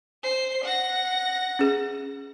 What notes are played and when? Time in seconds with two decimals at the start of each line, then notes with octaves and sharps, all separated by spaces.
0.23 C5 C7
0.64 F#5 A#6
1.59 C#4 G#4